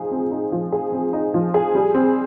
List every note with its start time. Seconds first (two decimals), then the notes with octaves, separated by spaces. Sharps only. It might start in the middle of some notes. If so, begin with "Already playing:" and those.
Already playing: F3 D#4 G#4
0.11 C4
0.31 D#4
0.52 F3
0.72 G#4
0.92 C4
1.13 D#4
1.34 F3
1.54 G#4
1.75 G3
1.95 C4